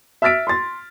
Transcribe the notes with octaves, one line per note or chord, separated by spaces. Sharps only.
E5 E6 F6 A6 B6 D7
C6 A6